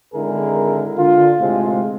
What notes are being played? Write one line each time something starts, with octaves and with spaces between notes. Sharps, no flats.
G#1 D3 G#3 E4 G#4 A#4
D3 F4
A2 C3 G#3 C4 F4